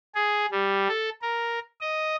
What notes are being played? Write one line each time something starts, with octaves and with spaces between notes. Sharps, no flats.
G#4
G3
A4
A#4
D#5